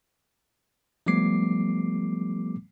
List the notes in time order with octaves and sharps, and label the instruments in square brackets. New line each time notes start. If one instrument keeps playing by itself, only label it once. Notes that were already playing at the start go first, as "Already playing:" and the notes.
[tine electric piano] F3 G3 A3 B3 D6 C7